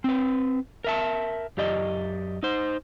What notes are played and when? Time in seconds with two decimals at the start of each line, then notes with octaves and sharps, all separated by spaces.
0.04 C4 B4
0.84 A#4 E5 A5
1.57 F#2 G4 D5 D#5
2.43 D#4 C5